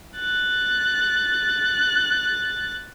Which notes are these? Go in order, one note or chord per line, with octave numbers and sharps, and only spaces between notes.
F#6 A6